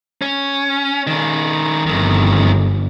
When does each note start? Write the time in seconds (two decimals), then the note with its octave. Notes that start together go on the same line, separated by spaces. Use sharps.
0.22 C#4
1.07 D#3 C#4
1.87 G1 F2 D#3